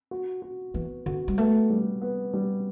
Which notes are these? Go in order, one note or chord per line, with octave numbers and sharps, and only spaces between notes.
F#4
F#4
E3 B3
D3 F#4
G3
A3 B3
G3
B3
G3